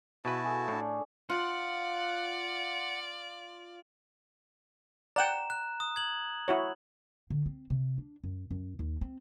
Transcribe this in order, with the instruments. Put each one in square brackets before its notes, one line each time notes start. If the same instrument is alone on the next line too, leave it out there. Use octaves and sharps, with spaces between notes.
[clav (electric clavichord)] B2 B4 [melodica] E4 F#4 A5 [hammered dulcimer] G#4 E5 F5
[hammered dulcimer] G#4 A4
[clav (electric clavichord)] A2 [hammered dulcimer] D4 C#5
[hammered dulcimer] F4 [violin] D5 [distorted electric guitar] F#5
[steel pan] D5 F#5 G5 [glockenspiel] A#5 E7
[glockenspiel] F#6
D#6
G#6 F#7
[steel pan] E4 F#4 C#5
[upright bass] D3
C4
C3
D4
F#2
F#2
D#2
C4